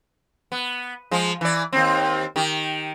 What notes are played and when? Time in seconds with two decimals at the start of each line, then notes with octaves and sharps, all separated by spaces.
0.52 B3
1.11 F3 G#3
1.41 E3 D5
1.73 D#2 C4
2.36 D#3 G4